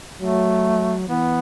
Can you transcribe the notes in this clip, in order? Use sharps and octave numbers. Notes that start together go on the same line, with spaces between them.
F#3 A3
E3 B3